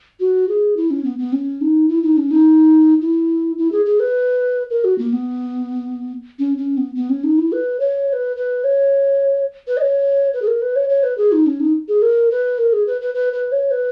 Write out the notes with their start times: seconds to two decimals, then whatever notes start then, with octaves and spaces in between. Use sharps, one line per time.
0.20 F#4
0.49 G#4
0.77 E4
0.90 C#4
1.04 B3
1.19 B3
1.33 C#4
1.61 D#4
1.89 E4
2.03 D#4
2.17 C#4
2.31 D#4
3.02 E4
3.58 E4
3.72 G#4
3.86 G#4
4.00 B4
4.70 A#4
4.84 F#4
4.98 A#3
5.13 B3
6.39 C#4
6.58 C#4
6.77 B3
6.95 B3
7.10 C#4
7.24 D#4
7.38 E4
7.52 B4
7.80 C#5
8.08 C#5
8.13 B4
8.36 B4
8.64 C#5
9.67 B4
9.77 D#5
9.81 C#5
10.34 B4
10.42 G#4
10.47 A#4
10.62 B4
10.76 C#5
10.89 C#5
11.03 B4
11.18 G#4
11.32 D#4
11.46 C#4
11.60 D#4
11.88 G#4
12.02 A#4
12.31 B4
12.58 A#4
12.73 G#4
12.87 B4
13.01 B4
13.15 B4
13.33 B4
13.52 C#5
13.71 B4